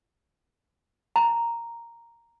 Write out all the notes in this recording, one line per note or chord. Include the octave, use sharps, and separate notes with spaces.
A#5